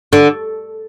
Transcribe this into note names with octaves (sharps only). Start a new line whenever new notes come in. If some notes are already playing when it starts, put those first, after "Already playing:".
D3